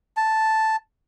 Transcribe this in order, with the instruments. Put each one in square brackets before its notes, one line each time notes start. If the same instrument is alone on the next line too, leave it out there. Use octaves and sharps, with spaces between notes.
[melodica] A5